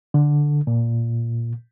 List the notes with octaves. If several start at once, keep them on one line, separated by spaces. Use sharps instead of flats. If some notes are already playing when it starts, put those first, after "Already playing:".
D3
A#2